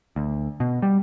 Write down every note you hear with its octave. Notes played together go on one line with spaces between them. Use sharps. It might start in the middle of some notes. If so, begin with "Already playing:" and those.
D2
B2
G3